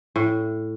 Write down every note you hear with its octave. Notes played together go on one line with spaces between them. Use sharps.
A2